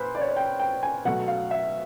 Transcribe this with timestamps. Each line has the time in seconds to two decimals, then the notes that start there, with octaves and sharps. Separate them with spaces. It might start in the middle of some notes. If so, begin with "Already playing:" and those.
Already playing: A#2 B4 C5
0.15 D5
0.21 C#5
0.29 D5
0.37 G5
0.59 G5
0.83 G#5
1.05 B2 F#3 A3 F#5
1.28 F5
1.51 E5